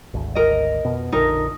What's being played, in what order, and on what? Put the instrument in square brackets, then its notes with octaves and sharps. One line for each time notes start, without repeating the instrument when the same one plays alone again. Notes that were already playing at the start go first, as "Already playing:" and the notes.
[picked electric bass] G#1 D2
[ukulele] A#4 D#5
[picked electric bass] F2 B2 B3
[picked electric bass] F1 A#1 D3 [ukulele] D#4 A#4